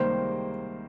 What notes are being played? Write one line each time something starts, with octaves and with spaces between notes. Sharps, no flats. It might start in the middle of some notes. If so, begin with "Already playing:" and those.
Already playing: C#2 C3 D#3 G3 A#3 C5